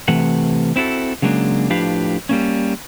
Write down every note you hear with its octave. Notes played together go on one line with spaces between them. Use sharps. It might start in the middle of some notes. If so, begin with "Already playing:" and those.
C3 E3 A3 F#5
C4 E4 F#4 G#4 A4
C#3 F#3 G#3 A#3 D4
A2 F3 D4 G4 B4 F5
G3 A#3 C#4